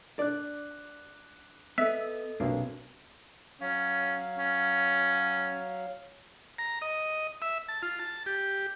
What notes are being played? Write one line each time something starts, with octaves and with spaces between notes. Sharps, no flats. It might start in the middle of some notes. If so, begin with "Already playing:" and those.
D4 D5 D6 F#6
B3 A4 D#5 E5
B1 C3 A#3 D4
F#3 C#4 F5
C#4
A#5
D#5
E5
A5
F4
A5
G4